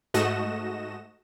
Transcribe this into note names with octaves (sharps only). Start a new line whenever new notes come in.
G#2 A3 F#4 D#5 A#6 E7